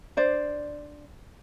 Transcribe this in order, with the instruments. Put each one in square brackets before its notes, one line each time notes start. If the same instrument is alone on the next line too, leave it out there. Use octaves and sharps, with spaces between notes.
[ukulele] D4 C5 D5